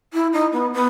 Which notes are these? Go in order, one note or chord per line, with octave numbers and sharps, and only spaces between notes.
E4
D#4
B3
B3